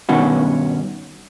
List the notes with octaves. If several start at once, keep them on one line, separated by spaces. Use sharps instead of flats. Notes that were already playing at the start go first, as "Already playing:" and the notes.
G2 B2 D#3 C#4 F#4